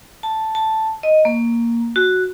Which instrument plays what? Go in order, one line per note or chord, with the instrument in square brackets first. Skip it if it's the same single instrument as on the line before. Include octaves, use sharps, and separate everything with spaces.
[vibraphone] A5
A5
D#5
A#3
F#4